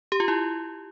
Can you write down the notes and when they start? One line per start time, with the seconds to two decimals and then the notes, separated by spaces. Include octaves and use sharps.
0.12 G4
0.20 F4
0.28 E4